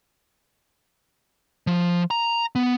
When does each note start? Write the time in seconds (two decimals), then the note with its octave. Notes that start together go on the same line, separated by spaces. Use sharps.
1.67 F3
2.11 A#5
2.55 B3